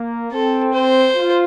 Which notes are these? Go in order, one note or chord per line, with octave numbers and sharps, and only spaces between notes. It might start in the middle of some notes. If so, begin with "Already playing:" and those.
Already playing: A#3
C4 A4
C5
F4